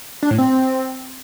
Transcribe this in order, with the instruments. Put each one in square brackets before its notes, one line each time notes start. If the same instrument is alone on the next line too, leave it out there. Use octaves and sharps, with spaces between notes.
[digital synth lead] D4
A2
C4